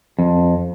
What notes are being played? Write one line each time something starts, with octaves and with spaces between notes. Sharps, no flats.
F2